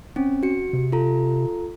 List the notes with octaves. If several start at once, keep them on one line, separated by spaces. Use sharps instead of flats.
C4 C#4
F#4 C#7
C3
F4 A4 A#5